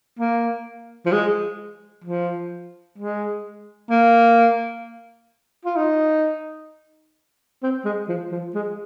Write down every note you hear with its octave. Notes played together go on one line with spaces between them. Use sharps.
A#3
F3
G#3
F3
G#3
A#3
F4
D#4
C4
G#3
F3
F3
G#3